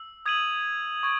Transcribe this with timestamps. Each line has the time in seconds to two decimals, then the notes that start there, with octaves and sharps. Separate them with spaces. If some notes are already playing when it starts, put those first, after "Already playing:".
Already playing: E6
0.26 D#6 G#6 D#7 F#7
1.03 C#6 G#6